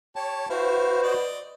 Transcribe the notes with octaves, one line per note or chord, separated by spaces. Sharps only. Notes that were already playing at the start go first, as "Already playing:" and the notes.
G4 C#5 A5
E4 F#4 B4 C5 F5
D5 D#5